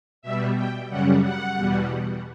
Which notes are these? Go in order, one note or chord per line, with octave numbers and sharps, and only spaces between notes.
B2 G3 E5
G5
F#2 C#3 G3 F#5
F#5
E2 B2 G3